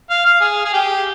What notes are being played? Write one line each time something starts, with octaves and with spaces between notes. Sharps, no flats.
F5
F5
G#4
G#4
G4